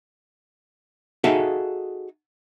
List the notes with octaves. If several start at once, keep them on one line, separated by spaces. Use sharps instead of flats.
D#4 F#4 G#4 A4 E5 F5